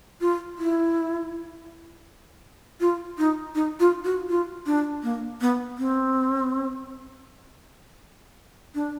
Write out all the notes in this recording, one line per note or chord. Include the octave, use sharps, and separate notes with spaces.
F4
E4
F4
D#4
D#4
F4
F#4
F4
D4
A#3
B3
C4
D4